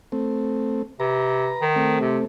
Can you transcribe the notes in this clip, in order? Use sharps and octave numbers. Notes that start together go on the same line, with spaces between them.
A3 C4
C3 B4 A#5
D#3
A3 C4
C3